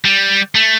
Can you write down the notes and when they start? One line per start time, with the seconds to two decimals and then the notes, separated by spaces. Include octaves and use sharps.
0.05 G3
0.55 A3